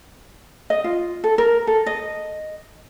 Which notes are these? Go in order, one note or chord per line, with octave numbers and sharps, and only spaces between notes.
D#5
F4
A4
A#4
A4
D#5